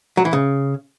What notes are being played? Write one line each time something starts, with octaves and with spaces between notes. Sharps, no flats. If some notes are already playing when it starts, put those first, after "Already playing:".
F#3
E3
C#3